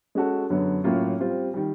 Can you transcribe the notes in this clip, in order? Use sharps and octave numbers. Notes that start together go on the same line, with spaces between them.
G#3 C#4 F#4 A4
F#2 D3 F#3 B3
A2 F#3 A#3 C#4 F4
G3 C4 F4
D#3 G3